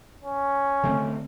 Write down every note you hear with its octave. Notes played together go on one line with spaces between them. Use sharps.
C#4
D3 A3 C4